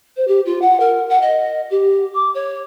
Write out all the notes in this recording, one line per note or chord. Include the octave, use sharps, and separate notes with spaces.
C5
G4
F4
F#5
A#4
F#5
D#5
G4
D6
C#5